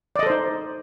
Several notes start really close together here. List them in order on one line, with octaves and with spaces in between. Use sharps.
D5 D#5 A4 C5 D#4